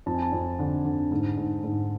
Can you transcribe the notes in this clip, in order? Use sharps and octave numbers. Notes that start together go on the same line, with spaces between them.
F2 A5
G#5
A5
F2
D3
D3
G#2
G#2
G#2